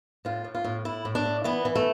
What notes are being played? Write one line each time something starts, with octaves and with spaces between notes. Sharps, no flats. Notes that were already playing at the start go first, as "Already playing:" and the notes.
A2 F4
A2
F4
A2
A2 E4
A2
D4
A2
E3 B3
E3
A3